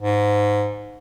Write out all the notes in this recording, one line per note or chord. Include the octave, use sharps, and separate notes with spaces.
G#2